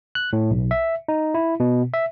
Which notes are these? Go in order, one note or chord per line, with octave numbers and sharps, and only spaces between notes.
F#6
A2
B1
E5
D#4
E4
B2
E5